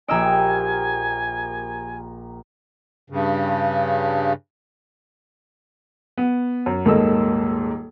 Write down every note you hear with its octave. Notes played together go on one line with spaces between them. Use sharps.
A#1 G4 A#4 D#5 G#5 E6 D7
G2 C#3
B3
F#2
D#1 G#2 A#3 A4 D#5 E6